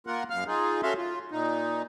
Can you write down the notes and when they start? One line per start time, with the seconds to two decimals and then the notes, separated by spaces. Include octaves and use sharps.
0.07 A#3 F4 A#4 F#5
0.30 F#2 F5 F6
0.47 D#4 F4 G#4
0.83 C#4 F#4 A4 E5 F5 C6
0.97 F4
1.31 A#2 D#4